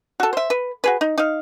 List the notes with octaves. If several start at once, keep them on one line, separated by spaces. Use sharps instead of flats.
F#4 A4
C5 E5
B4
F#4 G#4 B4
D#4
D#4 F5